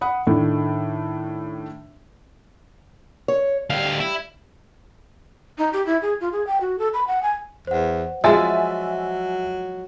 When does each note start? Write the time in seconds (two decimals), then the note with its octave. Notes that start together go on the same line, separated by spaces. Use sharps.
0.01 F#5 B5 D#6
0.27 A2 D#3 A3 D4
3.28 C#5
3.70 D2 G3 F5
4.00 E4
5.58 D#4
5.73 G4
5.86 E4
6.02 G#4
6.21 F4
6.32 G#4
6.47 G5
6.61 F#4
6.79 A4
6.94 B5
7.07 F#5
7.22 G#5
7.67 E2 C5 F#5
8.24 F3 F#3 G#3 E5 G#5 A6